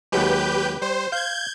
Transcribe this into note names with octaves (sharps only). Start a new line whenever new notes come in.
D#2 F#3 G#3 G4 B4 G6
G3 C5
F5 G6 G#6